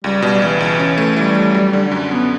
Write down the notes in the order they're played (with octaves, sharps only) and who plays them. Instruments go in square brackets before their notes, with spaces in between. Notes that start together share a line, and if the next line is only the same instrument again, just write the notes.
[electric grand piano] C#2 [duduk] G3
[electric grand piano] B2 [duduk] G3
[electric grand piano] C#2 [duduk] E3
[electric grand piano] C#2
C#4
A3
[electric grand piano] E3 [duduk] G3
[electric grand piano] A3
F#3
D3
F#2
[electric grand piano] F#2 [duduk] B3